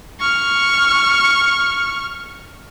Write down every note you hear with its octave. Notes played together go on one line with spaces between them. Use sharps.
C#6 F6